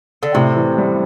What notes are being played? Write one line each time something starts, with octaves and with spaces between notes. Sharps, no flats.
D3
A2 C3
E3
G3